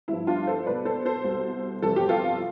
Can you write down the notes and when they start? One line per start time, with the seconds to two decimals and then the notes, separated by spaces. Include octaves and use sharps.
0.08 G1 G2 F3 E4
0.27 D4 F4
0.47 A4 C5
0.66 B1 B2 B4 D5
0.85 A4 C5
1.05 A4 C5
1.24 C2 B2
1.82 G1 F2 C3 E3 A4
1.96 G4
2.09 F4 A4